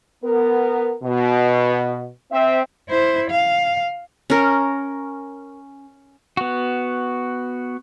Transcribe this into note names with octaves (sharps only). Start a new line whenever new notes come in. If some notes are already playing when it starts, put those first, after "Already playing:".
B3 A#4
B2
C4 E5
E4 C5
F5
C#4 A#4
B3 F#4